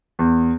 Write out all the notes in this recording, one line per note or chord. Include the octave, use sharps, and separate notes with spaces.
E2